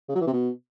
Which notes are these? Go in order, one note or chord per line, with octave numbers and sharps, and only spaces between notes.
C#3
F#3
E3
C3
B2